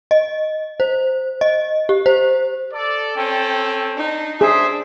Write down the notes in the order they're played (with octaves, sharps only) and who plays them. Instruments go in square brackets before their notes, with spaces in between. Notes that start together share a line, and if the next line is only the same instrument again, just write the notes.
[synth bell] D#5
C5
D#5
G4
C5
[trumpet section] A4 D5
[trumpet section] C4 C#4 A4 [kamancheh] G5
[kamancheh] D4 D#4
[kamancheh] D4 [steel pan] G#4 [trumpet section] C5 E5